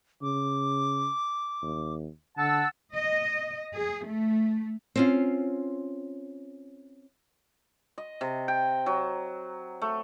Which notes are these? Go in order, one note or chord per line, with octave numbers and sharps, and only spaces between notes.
C#3 D6
D#2
D3 F#5 A5 E6
D#5
G#4
A3
C4 C#4 F4
D#5
C3
G5
F#3
A3